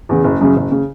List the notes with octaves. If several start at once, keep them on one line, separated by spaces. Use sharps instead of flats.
E2 C#3
F#1
F#2 C#3
F#1
C#3